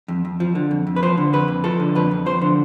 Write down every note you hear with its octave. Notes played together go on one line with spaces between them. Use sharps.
F2
F2
F3
D3
F2
F2
B4
F3 C5
D3
F2 B4
F2
F3 A4
D3
F2 B4
F2
F3 C5
D3